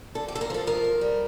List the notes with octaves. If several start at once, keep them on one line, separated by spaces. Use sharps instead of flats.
D3 A4
G4
F2 A4
A#4
F3 A4
F2 A#4
F2
G3